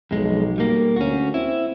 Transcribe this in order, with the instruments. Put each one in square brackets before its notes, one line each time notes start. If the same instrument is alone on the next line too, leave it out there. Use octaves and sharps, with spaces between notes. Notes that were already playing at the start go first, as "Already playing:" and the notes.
[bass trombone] B1 [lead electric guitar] F2 G#3
[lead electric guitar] G3 A#3
[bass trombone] D2 [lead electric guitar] C#4 F#4
[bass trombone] C4 [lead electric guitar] E4